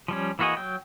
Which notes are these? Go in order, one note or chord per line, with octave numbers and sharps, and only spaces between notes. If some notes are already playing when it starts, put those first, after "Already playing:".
F3 G3 C#4
E3 A#3 F#4 G#4 D#5
F#3 G5